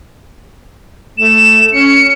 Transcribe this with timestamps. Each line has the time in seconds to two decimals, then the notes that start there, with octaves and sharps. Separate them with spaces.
1.18 A3 E7
1.73 C#4 C#7